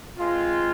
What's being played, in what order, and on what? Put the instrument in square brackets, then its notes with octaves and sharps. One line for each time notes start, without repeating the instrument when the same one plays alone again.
[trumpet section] G#3 C4 F4